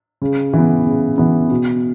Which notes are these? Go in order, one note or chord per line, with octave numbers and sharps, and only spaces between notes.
C#3
E3 B3
C#3
E3 B3
B2